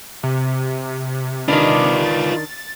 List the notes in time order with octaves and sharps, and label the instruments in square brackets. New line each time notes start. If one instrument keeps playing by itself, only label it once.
[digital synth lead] C3
[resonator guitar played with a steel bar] D#3 D4 [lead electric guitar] F4 B4
[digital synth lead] A6